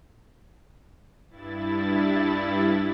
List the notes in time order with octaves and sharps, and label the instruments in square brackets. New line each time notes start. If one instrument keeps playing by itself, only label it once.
[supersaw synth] G2 E4 A6